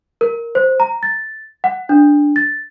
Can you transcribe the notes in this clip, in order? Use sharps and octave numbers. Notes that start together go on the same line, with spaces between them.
A#4
C5
A#5
A6
F#5
D4
A6